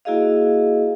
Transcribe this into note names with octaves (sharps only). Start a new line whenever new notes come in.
A#3 E4 F#4 G#4 D#5 F5